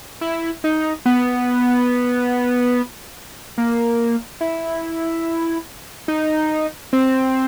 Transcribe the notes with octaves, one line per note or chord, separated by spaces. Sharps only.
E4
D#4
B3
A#3
E4
D#4
C4